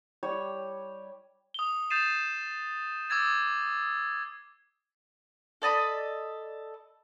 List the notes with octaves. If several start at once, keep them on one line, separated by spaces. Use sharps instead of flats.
G3 C#5
D#6 G7
D#6 G6 A6 C7 D#7 E7
D6 E6 G#6 A6
A4 D5 D#5 B5